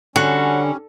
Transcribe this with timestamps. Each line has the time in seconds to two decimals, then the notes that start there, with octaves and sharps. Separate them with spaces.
0.16 D3 G3 C#4 F#4